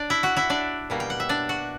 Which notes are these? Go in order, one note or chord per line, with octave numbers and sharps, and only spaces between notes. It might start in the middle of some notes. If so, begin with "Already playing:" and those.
Already playing: D4 D5
E4 E5
F#4 F#5
E4 E5
D4 D5
B2 G3 A#3
G5
F#5
E5
D4 D5
F#4 F#5